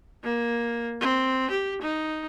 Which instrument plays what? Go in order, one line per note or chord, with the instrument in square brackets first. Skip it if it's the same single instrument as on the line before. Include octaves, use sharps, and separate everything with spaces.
[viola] A#3
C4
G4
D#4